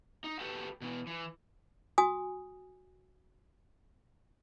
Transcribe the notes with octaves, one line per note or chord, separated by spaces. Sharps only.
D#4
F#4 G4 A4 B4
B2 E3
E3
F#4 G#5 D#6